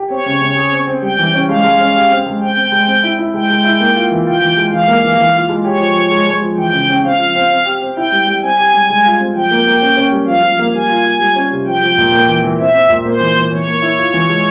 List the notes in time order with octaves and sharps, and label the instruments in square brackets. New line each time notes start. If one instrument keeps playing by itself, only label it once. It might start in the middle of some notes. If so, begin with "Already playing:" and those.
Already playing: [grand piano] G4
[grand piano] C4 [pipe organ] C#5
[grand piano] C#3
C#3
G#4
C4
C4
[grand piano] G3 [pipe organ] G5
[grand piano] E3
C#4
[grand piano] G#3 [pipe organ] F5
[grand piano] G#3
C#4
G4
C4
G#3
[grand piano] C4 [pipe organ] G5
[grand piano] C4
G#3
C4
E4
E4
[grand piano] G#3 [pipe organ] G5
[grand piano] G#3
E4
A#3
F4
E3
[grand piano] F4 [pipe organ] G5
[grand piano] E3
G#3
[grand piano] E3 [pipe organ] F5
[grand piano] A#3
E3
E3
F4
G#3
[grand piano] G4 [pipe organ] C#5
[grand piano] F3
F3
G#3
G#3
F3
[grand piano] E3 [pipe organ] G5
[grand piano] C#3
C#4
[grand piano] C4 [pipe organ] F5
[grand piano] F3
C4
C4
G4
C4
[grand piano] E4 [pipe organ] G5
[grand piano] G3
G3
[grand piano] C4 [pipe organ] G#5
[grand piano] G4
G3
G#3
F4
C4
[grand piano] F3 [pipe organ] G5
[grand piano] A#3
A#3
C#4
C#4
G3
[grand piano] F3 [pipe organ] F5
[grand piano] F3
A#3
[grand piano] G3 [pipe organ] G#5
[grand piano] F4
F4
G3
C#4
C3
[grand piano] F3 [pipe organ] G5
[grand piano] F3
A#2
A#3
E3
E3
[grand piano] C4 [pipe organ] E5
[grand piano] C4
A#2
[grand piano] A#3 [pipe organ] C5
[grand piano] E3
E3
[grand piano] E3 [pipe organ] C#5
[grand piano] A#3
E4
F4
E3
G#3